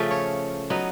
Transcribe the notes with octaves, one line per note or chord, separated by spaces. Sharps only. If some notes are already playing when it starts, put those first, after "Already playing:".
Already playing: C#3 F3 A3 C#4 A4
C#5
F#3 B3 D#4